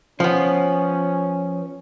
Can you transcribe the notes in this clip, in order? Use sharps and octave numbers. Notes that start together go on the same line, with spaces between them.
F3 B3 C#4